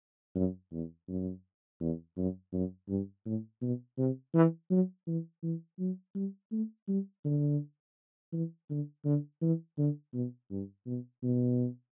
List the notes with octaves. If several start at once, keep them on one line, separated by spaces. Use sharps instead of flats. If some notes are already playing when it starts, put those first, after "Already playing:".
F#2
E2
F#2
E2
F#2
F#2
G2
A2
B2
C3
E3
F#3
E3
E3
F#3
G3
A3
G3
D3
E3
D3
D3
E3
D3
B2
G2
B2
B2